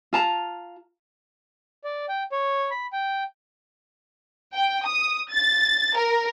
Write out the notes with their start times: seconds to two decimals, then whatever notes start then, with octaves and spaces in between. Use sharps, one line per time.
0.13 F4 A5 A#5
1.84 D5
2.09 G5
2.32 C#5
2.71 B5
2.93 G5
4.54 G5
4.86 D#6
5.32 A6
5.97 A#4